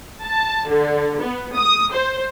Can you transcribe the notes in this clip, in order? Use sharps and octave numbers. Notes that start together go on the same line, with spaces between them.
A5
D3
B3
D#6
C5